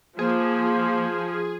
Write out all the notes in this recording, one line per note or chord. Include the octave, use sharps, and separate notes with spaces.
F3 A#3 G#4